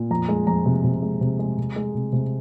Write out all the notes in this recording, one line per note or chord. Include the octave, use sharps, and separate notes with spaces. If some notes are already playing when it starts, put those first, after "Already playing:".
Already playing: A#2
F2 A#5
G#3
F2 A#5
C3
C3
G#3
C3
G#3
C3
G#3
C3
C3